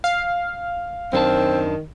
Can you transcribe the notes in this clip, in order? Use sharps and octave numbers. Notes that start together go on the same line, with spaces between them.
F5
F#2 D#3 C4 D4 A5